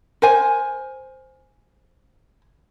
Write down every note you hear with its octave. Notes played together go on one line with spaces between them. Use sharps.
A#4 C5 G#5